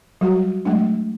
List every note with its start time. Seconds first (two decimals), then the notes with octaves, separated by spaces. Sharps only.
0.21 F#3 G3 F#4
0.65 F#3 G#3 A3 D4